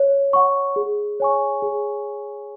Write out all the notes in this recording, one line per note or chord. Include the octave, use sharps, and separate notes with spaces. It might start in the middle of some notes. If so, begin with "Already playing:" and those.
Already playing: C#5
F#5 C#6
G#4
C#5 G#5 C#6
G#4